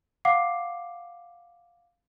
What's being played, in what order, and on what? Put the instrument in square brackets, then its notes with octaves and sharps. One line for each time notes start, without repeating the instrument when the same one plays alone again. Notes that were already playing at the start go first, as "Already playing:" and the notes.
[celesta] F5 F#5 D6 C7